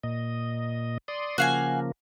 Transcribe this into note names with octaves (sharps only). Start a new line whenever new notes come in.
A#2 D#5
D5 C6 D#6
C#3 F3 A#3 F#4 F5 G#5